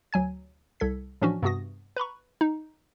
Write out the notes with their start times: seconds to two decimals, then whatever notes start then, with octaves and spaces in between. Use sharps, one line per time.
0.13 D2 F#3 G#5 G#6
0.80 C2 A4 G#6 B6
1.21 A2 E3 F3 C#4 D4 F#4
1.43 G2 C3 B3 F#4 D#6 A#6
1.96 B4 A#5 B5 C#6
2.41 D#4